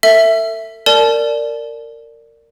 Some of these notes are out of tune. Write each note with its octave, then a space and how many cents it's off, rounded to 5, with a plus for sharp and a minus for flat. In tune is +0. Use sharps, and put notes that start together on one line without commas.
A4 +40 E5 +0
A#4 -20 D5 +0 A5 -30